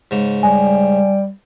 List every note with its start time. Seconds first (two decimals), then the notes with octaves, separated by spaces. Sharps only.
0.11 G#2 C#3
0.43 G3 G#5